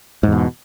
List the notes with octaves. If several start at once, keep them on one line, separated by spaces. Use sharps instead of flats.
E2 G#2 B2